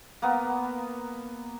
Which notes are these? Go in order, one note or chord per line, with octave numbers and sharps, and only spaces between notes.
A#3 B3